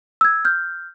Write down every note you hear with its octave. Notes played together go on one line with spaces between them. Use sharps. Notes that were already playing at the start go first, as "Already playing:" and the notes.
E6 G#6
F6 G6